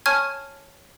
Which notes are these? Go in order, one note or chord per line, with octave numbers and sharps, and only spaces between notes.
C#5 G#5 A5 C#6 F6 G#6